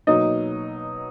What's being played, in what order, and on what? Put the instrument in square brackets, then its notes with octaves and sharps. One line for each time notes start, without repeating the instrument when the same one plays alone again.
[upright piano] B2 F#3 A#3 D#4 D#5